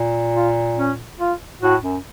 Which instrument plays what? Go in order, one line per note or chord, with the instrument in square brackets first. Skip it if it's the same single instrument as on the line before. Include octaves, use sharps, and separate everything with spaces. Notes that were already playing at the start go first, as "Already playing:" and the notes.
Already playing: [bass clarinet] A#2
[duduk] F4
C#4
F4
[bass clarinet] A2 [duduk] F#4
[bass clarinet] F#2